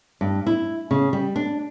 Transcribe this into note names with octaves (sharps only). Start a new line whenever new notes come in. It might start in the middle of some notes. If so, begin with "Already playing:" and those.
G2
E4
C#3
G3
D4